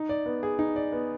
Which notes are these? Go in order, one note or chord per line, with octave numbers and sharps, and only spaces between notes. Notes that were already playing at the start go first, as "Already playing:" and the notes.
Already playing: D#4
D5
B3
G#4
D#4
D5
B3